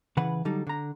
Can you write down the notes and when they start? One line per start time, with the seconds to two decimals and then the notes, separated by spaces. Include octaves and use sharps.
0.17 C#3 E3 B4 F#5
0.45 D3 F#3 G3 D#4 A4
0.67 D3 A#5